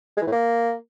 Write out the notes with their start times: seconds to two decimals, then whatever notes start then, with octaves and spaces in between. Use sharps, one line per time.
0.17 G#3
0.22 E3
0.27 A2
0.32 A#3